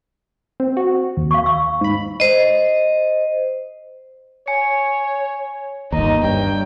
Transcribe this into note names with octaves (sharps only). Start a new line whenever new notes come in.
C4
F#4
D#2
F5 C#6
C#6 E6
G#2 B5
C5 D#5
C#5 G#5 C#7
G1 D#2 D#4 A#5
G2 C#5 G5